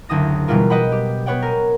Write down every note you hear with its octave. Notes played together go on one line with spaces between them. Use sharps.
F#1 D2 E4 D#6 A#6
B2 E3 G3 E4 F4 A#4
B4 D#5 F#5 G5 B5
G4
B3 B4 C#5 F#5 G5
A#4 G#5